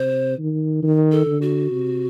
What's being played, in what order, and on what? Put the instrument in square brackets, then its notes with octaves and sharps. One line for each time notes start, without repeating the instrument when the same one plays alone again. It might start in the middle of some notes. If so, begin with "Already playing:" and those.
Already playing: [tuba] C3 [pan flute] C5
[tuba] D#3
D#3
[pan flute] A4
[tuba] D3
[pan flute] F#4
[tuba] C3